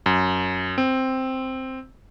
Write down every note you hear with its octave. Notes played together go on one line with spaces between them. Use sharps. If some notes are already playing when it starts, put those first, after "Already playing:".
F#2
C4